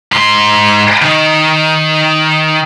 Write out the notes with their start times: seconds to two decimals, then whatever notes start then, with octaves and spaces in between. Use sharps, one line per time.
0.12 G#2 C6
1.02 D#3